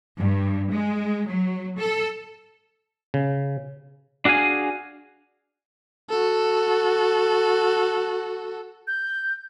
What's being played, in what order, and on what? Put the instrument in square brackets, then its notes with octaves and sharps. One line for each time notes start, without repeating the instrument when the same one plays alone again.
[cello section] G2
G#3
F#3
A4
[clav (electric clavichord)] C#3
[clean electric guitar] D4 F#4 G#4 F5 G#5
[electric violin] F#4 A4
[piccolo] G6